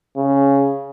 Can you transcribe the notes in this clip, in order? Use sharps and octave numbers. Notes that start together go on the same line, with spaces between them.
C#3